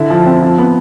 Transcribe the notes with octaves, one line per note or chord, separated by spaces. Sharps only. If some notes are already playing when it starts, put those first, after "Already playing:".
Already playing: D3 E4
F3
C4
F3
B3